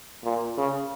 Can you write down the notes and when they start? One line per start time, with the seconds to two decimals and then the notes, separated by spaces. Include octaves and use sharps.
0.24 A#2
0.57 C#3